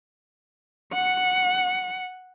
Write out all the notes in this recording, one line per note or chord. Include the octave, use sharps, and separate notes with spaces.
F#5 C#7